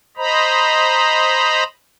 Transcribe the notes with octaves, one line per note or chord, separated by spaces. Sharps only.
C5 D#5 A#5 B5